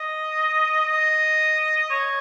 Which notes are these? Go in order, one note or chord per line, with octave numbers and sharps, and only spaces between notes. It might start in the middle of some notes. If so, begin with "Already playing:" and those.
Already playing: D#5
D#5
C#5